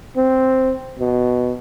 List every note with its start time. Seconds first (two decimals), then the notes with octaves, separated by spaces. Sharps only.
0.17 C4
0.99 B2